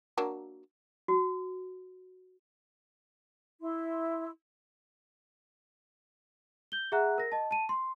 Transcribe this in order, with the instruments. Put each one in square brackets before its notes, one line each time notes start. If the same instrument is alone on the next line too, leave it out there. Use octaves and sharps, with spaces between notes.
[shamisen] F#3 A#3 D4
[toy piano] F#4
[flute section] E4 C6
[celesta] G6 G7
G#4 E5 F#5 A#5 F#6
A#4 A#6
D#5 A5
A5 D#7
C6